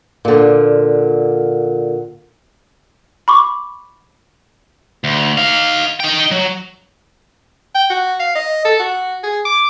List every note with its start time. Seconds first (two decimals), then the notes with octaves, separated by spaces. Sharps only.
0.25 A#2 D3
3.28 B5 C#6 D6
5.04 D2
5.38 D#4 F5
6.00 D#4 G5
6.31 F#3
7.75 G5
7.90 F#4
8.20 F5
8.35 D#5
8.65 A4
8.80 F#4
9.23 G#4
9.45 D6